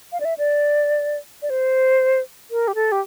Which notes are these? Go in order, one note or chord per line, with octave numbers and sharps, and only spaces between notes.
F5
D5
E5
D5
D5
C5
A#4
G4
A4
G4